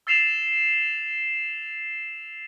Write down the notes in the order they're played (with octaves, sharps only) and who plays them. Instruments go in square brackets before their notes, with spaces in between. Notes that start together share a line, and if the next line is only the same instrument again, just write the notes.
[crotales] E6 A6 C7 E7 F7